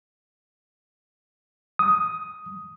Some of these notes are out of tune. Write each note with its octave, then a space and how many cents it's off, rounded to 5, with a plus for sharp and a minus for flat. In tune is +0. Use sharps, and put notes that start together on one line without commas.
D#6 +5